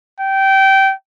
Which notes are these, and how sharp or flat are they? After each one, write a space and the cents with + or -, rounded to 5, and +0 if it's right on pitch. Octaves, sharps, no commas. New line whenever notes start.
G5 -20